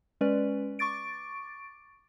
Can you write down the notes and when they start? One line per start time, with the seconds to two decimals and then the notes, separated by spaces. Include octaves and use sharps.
0.21 G#3 C#4 B4 D5
0.79 C#6 D6 A6 D7